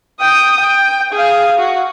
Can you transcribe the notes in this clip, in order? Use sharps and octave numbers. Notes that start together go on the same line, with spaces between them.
G5 D#6
G5
G#4 F5
F#4